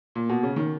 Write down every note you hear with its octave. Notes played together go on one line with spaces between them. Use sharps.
A#2
B2
C#3
D#3